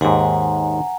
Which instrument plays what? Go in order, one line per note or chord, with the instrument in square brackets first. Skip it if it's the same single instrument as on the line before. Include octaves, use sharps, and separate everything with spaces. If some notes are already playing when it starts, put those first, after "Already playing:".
[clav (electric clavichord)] D#2 G#2 [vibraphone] F#5 G#5 A#5